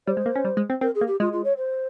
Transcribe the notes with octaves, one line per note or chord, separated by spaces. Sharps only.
G3 C#5
C5
G#3
A#3
C#4
G3
G#3
C4
C4 A#4
G#4
A#3
G4
G#3 F4
F4
C#5
C5